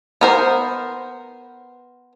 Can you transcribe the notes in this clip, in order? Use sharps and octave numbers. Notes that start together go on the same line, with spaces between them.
B3 A#4 C5